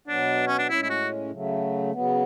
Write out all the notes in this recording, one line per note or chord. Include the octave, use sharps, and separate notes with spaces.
B2 F#3 B3 D4
C#4
D4
A2 G#3 C#4 E4
E4
F#4
C#3 F#3 A3
C#3 F#3 B3